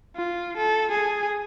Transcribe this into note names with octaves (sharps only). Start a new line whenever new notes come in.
F4
A4
G#4